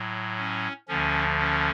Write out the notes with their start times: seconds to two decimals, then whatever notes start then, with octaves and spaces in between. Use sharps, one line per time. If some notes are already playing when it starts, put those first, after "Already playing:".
Already playing: A2 F#3
0.37 C#4
0.88 D2 D3 F3 C#4
1.39 C#4